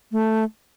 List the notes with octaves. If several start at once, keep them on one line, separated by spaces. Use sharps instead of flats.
A3